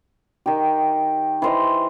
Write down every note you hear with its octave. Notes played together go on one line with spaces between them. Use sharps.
D#3 G4
E3 C5 D#5